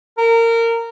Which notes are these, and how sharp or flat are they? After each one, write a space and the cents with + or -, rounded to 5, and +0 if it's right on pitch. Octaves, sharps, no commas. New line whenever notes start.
A#4 -20